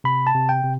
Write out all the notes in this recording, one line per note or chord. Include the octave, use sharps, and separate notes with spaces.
C3 B5
A5
C3
G5
C3